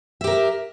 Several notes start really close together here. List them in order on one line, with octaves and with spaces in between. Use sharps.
E5 G4 A#4